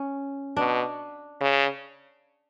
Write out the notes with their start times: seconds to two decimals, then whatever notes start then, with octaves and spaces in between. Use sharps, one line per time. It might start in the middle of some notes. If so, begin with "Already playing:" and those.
Already playing: C#4
0.57 B2 D4
1.40 C#3